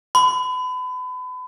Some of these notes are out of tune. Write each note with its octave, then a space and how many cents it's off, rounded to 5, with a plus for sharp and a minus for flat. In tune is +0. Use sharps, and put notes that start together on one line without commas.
B5 +35